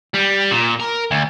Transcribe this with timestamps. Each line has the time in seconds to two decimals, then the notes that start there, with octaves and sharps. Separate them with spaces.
0.14 G3
0.51 A#2
0.80 A#4
1.11 D2